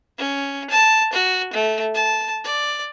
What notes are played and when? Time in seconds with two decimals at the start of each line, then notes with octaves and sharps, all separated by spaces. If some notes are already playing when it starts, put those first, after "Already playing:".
0.18 C#4
0.70 A5
1.13 F#4
1.53 A3
1.94 A5
2.45 D5